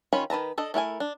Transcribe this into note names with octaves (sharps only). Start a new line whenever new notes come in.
D#3 C#4 F4 C#5 B5
D#3 B4 A5 A#5
D4 A4 D#5
A3 E4 A#4 G#5
D4